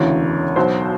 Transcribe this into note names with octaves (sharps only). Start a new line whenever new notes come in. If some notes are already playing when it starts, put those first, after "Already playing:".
Already playing: E1 D2 C#3 E3 C#5
B1 B2 F#3 C5